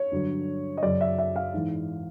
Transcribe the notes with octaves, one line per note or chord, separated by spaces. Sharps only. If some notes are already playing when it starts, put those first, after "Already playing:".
Already playing: C#5
G2 D3 F#3
D#5
F#2 C#3 F#3 D5
E5
E5
F5
G#2 E3